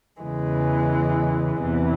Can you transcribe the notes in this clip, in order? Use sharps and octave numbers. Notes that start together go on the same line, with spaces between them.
E2 C#3 E3 G#3
E2 C3 E3